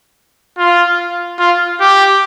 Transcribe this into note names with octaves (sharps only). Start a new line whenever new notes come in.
F4
F4
G4